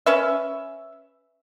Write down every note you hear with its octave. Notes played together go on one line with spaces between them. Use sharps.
C#4 B4 E5